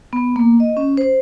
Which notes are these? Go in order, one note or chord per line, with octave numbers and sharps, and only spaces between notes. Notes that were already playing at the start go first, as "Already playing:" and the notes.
B3
A#3
D#5
C#4
C5